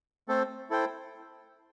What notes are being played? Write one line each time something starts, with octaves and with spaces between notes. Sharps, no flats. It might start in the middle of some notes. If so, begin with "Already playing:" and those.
A3 C4 A4 C5
E4 A4 C5 G5